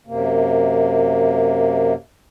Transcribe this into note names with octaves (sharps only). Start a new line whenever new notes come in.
F#2 C3 A#3